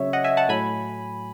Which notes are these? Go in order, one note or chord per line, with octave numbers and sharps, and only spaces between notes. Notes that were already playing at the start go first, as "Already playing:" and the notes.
Already playing: C#3 F#3 C#5 E5
D#5 F#5
E5 G#5
F#5 A5
A2 F#3 G#5 B5